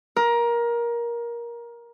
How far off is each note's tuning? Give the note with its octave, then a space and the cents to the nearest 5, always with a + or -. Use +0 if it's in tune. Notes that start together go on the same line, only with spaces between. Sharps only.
A#4 +20